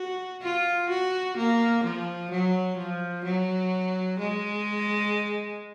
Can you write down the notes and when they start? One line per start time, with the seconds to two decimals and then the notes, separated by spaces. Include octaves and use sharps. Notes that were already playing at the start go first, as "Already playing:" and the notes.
Already playing: F#4
0.42 F4
0.90 F#4
1.37 A#3
1.84 F3
2.31 F#3
2.78 F3
3.25 F#3
4.19 G#3